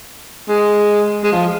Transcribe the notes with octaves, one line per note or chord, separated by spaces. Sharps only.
G#3
G#3
F3